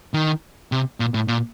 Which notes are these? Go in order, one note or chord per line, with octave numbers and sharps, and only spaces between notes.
D#3
C3
A#2
A2
A#2